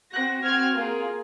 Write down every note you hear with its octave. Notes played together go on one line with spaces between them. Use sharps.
C4 F#4 F#6 A#6
C4 F#4 F6 G#6
A#3 F4 G#4